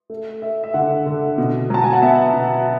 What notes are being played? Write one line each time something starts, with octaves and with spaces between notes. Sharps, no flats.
A3
A3 E5
E5
D3 F#5
D3
B2
F#3 A5
G#5
F#5
B3 E5
B2